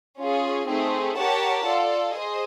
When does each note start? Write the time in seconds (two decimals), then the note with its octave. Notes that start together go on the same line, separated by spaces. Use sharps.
0.20 C#4 F4 G#4
0.68 A3 C4 D#4 G#4
1.16 G4 A#4 C#5 F#5 A5
1.65 F4 A4 D5
2.14 G#4 C5 D#5